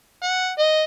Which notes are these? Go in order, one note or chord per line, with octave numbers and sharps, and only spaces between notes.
F#5
D#5